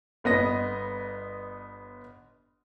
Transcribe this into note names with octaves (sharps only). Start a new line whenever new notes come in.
G1 B3 D#5 A#6